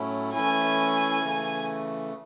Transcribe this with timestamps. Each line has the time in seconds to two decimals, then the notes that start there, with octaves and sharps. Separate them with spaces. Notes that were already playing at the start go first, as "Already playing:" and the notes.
Already playing: A2 F#3 A3 C#4 E4
0.34 E3 A3 C#4 E4 G#5
1.23 C#3 E3 A3